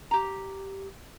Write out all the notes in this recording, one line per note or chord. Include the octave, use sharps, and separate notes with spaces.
G4 A#5